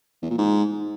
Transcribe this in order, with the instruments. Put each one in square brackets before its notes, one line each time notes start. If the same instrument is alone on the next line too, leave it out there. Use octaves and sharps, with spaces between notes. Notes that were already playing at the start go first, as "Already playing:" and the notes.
[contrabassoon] E2
A#2
G#2